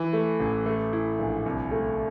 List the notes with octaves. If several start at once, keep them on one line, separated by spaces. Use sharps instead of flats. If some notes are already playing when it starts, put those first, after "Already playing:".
Already playing: E3
A3
A1
A3
E4
A#1
C2
A3